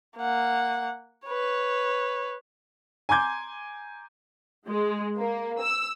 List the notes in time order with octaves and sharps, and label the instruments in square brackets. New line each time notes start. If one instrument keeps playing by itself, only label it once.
[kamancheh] A#3 F#5
B4 C#5
[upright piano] G#5 A#5 C6 D6 G6 G#6
[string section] G#3
A#3
E6